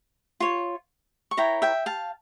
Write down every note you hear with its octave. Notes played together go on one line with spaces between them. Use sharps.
F4 C#5
C#6
E4 A#4 C#5 G5 A#5
E5 G5
F5 A5